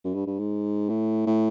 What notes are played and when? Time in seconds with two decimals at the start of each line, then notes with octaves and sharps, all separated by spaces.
0.04 F#2
0.15 G2
0.27 G2
0.39 G#2
0.89 A2
1.27 A2